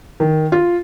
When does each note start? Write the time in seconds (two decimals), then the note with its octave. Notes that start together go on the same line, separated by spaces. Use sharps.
0.20 D#3
0.52 F4